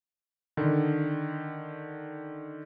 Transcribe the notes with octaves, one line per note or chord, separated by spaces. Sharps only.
D3 D#3